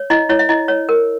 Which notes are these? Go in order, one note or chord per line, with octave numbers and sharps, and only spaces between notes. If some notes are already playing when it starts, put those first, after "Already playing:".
Already playing: C#5
E4 D#5
E4 C#5
E5
E4 D#5
C#5
A#4